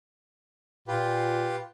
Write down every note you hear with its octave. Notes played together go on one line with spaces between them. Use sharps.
A#2 F4 G4 B4